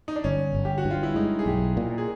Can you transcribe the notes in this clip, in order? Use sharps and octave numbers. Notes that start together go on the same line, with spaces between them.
D#4
D4
G1 C#4
G1
G4
F#4
G2
F4
E4
G#3 D#4
G#4
B1 G4
A#2
G#4